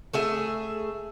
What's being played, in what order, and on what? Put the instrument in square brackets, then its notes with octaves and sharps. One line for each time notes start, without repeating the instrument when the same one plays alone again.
[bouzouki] A3 G#4 E5